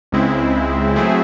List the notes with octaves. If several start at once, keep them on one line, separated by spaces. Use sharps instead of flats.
C#2 C#3 G#3 C4 E4
F#3 A3 C4 E4 G#4